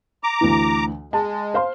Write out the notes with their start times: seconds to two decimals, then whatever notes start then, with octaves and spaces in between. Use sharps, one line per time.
0.23 A#5 D6
0.41 D2 E3
1.13 G#3 A5
1.54 C5 F5 C6